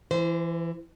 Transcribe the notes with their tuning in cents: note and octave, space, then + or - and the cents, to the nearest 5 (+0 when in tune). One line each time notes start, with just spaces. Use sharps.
E3 +20 C5 -25